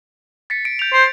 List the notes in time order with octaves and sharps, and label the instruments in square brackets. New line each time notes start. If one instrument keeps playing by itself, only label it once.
[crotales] A6 B6 C#7
D7
G6 F7
[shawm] C5